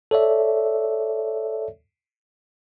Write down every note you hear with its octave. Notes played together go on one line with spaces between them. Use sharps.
A4 C#5 D5 E5